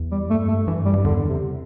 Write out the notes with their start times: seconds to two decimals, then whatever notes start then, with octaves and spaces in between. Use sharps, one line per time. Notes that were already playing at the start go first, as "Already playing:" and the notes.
Already playing: E2
0.12 G3
0.29 G2 A3
0.48 A3
0.67 G2 E3
0.86 G3
0.93 G2
1.04 E2 D3
1.29 C3